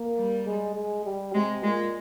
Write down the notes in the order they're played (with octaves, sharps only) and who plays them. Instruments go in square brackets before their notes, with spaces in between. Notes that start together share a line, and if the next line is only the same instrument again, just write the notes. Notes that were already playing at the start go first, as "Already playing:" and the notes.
Already playing: [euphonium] A#3
[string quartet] G3
[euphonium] G#3
G#3
G3
[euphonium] C3 [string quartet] G#3
[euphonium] A#2 [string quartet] G#3